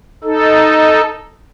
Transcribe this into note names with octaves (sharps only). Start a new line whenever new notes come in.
D#4 A4